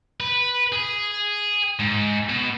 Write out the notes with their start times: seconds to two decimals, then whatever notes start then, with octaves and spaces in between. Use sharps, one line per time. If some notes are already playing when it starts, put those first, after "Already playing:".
0.20 B4
0.72 G#4
1.80 G#2
2.29 B2